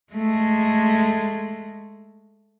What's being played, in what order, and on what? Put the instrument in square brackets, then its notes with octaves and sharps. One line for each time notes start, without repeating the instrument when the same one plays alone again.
[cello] G#3 A3